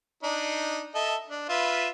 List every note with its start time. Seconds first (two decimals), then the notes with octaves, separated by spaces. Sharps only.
0.23 D4 D#4
0.95 A4 D#5 E5
1.29 D4
1.49 F4 B4 E5